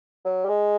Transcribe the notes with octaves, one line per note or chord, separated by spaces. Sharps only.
F#3
G3
G#3